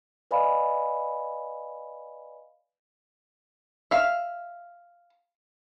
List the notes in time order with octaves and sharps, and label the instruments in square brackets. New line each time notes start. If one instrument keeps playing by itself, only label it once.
[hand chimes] B4 D5 D#5 F5 G#5 B5
[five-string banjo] E5 F5